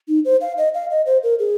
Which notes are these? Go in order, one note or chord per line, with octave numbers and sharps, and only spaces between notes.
D#4
C5
F5
D#5
F5
D#5
C5
A#4
G#4